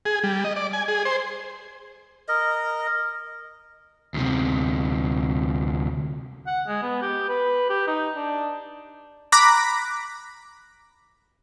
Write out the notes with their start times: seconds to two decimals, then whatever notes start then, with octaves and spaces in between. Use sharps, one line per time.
0.05 G#4
0.24 G3
0.44 D#5
0.56 D5
0.73 G#5
0.88 G#4
1.05 C5
2.28 A#4 D#5
4.14 D2 C3
6.47 F#5
6.68 G#3
6.83 B3
7.02 G4
7.29 B4
7.70 G4
7.87 D#4
8.16 D4
9.32 A#5 B5 D6 F#6 A#6 B6